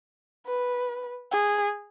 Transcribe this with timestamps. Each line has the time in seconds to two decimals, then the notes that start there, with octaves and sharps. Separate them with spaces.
0.47 B4
1.32 G#4